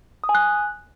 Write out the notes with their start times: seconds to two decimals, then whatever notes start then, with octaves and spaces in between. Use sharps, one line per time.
0.24 D#6
0.29 G#5
0.35 F#6